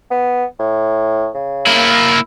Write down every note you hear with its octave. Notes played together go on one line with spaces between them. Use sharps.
B3
A2
C#3
A#3 E4